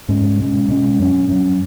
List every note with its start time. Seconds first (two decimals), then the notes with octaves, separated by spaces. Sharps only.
0.08 G#2 G#3 C#4
0.39 B2 G#3 C#4
0.68 B2 G#3 C#4
0.99 F#2 F#3 C#4
1.28 F#2 F#3 C#4